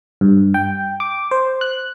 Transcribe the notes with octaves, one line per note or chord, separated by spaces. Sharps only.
G2
G5
D6
C5
F#6